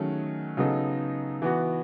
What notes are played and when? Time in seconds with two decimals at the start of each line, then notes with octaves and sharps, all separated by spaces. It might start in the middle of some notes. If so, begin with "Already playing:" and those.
Already playing: D#3 F#3 A3 C#4 G#4
0.57 C#3 F#3 B3 D#4 A4
1.42 E3 B3 F#4